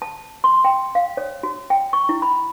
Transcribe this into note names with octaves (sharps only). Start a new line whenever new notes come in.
A5
C6
G5
F5
C#5
F#4
G5
C#6
E4
B5